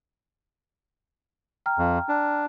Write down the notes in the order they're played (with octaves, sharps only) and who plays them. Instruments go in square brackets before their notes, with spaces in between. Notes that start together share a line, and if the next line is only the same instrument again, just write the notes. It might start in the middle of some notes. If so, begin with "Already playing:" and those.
[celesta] G5 A#5 F6
[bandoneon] F2
D4